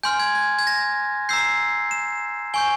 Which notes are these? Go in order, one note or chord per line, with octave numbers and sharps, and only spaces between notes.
G#5 C6 F6 G6
G#6
G#6
G#6
A#6
A#5 E6 G6 C7
E7
G#5 C#6 G6 G7